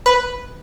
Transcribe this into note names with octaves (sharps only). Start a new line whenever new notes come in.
B4